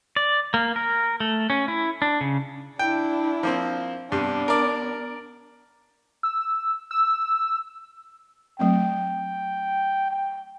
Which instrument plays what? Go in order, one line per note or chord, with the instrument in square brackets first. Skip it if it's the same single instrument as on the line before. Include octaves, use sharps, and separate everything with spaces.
[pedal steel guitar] D5
A#3
A#4
A3
C#4
E4
D4
C#3
[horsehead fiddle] D4 E4 [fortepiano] G5
[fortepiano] F3 A#3 C4
[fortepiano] G2 C3 [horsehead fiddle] B3 D4
[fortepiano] A#4 D5
[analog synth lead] E6
E6
[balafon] F#3 A3 C4 [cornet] G5
[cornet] G5